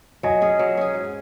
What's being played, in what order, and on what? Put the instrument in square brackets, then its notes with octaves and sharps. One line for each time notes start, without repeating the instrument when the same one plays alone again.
[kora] F#3 [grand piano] D#5 G#5
[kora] C#4 G#4
F#3
C#4 G#4
G#2